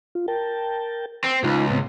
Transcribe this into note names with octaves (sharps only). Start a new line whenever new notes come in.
F4
A#4 G5 A5
C4
C#2 D#4 F4
A2 B3 C4